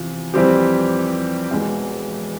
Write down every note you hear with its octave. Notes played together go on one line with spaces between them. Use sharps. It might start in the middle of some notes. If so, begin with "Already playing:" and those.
Already playing: E2 C3 F3
F2 E3 G3 C4 G4
E1 E2 E3 G#3